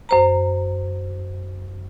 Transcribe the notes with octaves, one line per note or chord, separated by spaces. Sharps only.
F#2 C5 A#5